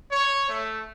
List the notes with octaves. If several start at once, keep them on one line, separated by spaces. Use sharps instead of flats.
C#5
A3